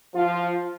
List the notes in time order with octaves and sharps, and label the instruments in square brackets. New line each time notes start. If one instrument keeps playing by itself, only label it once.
[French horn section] F3 F4